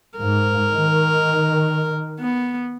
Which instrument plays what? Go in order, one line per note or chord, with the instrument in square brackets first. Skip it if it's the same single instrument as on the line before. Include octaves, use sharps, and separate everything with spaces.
[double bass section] G#2 [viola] A#4
[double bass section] D#3
[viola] B3